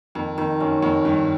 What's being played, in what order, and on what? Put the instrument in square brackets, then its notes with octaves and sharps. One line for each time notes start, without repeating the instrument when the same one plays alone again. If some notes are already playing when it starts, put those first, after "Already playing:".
[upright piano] F2 [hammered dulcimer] D#3
[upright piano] F2 [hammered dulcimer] D#3
[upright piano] F#2 [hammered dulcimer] C#4
[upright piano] F2 [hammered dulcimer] F#4
[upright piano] G2 [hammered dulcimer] D#3